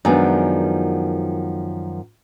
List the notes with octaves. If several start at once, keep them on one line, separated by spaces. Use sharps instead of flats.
F#2 D#3 F3 G#3 B3 D4